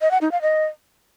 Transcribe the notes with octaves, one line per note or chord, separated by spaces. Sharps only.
D#5
F#5
D#4
F5
D#5